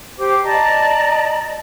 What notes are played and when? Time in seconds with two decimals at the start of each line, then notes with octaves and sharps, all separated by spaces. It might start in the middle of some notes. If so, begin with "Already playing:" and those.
0.17 G4 C5 D6
0.44 D5 D#5 A5 A#5